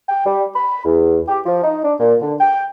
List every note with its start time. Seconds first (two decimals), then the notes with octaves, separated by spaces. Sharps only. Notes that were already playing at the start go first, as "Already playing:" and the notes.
0.09 G5
0.26 G3
0.56 B5
0.85 E2
1.29 G4
1.46 F3
1.64 D#4
1.85 D4
2.00 A#2
2.22 D3
2.41 G5